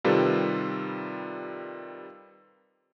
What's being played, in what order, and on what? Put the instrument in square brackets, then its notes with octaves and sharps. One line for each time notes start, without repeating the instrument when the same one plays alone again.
[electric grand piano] C3 D#3 G3 F4 A4 B4